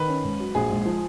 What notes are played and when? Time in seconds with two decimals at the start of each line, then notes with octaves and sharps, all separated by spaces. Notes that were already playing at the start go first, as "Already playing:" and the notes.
Already playing: D#3 B4
0.08 C#4
0.24 G#2
0.40 F#3
0.55 A#1 G#4
0.70 G#2
0.86 F3